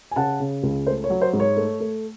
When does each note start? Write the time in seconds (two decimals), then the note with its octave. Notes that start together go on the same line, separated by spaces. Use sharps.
0.11 G#5
0.16 C#3 F#5 A5
0.40 C#3
0.63 C#2
0.86 A3 C5
1.04 C#5
1.10 F#3
1.22 C5
1.33 G#2
1.40 C#5
1.57 A3
1.80 A3